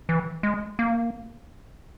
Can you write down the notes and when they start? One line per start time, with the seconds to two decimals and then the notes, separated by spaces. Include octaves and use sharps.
0.09 E3
0.43 G#3
0.79 A#3